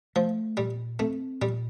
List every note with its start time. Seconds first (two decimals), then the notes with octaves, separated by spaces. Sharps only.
0.16 F3 A3
0.57 A#2 G3
0.99 A3 C4
1.41 A#2 G3